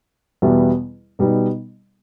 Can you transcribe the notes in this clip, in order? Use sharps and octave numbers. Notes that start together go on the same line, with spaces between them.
E2 B2 G3 B3 E4
B2 G3 B3 D#4